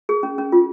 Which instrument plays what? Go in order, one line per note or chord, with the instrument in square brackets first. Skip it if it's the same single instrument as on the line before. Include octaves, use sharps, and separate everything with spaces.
[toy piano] G#4
C#4
C#4
F4